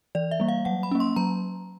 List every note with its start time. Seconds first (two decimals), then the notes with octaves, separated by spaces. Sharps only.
0.15 E3 D5
0.31 E5
0.40 G3 A#3
0.48 F5
0.65 F#3 F#5
0.83 B5
0.91 A#3 C#4
1.00 C6
1.16 F#3 A#5